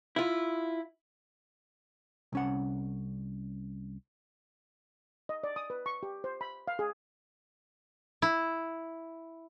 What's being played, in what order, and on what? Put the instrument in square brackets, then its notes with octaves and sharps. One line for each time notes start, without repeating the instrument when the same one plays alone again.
[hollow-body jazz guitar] E4 F4
C2 C#4 F#5
[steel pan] D#5
D5
D#6
B4
C#6
G4
C5
B5
F5
G#4
[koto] E4